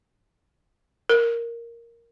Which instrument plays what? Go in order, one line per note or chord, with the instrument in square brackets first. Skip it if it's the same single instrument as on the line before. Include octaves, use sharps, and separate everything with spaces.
[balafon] A#4